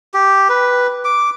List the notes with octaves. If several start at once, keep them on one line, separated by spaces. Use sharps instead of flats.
G4
B4
D6